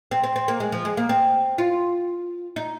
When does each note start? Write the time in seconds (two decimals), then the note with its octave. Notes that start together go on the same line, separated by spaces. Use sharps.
0.11 C4
0.23 C4
0.36 C4
0.48 A#3
0.60 G#3
0.72 F3
0.85 G#3
0.97 A#3
1.09 C4
1.58 F4
2.56 D#4